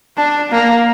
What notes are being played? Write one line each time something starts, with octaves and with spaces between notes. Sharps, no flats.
D4
A#3